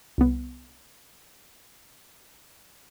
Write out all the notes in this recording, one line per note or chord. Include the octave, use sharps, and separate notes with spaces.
C2 B3